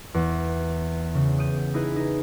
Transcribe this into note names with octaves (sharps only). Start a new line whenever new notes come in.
E2
C#3
D#6 G6 D#7
D#4 E4 G#4 B4
D#4